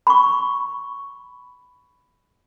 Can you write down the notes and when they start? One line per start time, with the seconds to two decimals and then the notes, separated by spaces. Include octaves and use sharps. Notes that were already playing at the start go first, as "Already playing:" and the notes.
0.07 B5 C#6